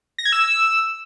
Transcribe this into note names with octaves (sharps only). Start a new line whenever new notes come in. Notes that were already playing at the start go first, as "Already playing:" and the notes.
A#6
G#6
E6